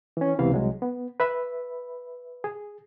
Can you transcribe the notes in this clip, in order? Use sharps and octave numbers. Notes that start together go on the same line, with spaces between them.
E3 C#4
C#2 C3 E3 B3 F5
C2 F#3 G#3
B3
B4 E5 B5
G#4